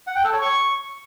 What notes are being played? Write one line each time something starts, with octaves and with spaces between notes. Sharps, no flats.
F#5
G5
A4
C#5
C#6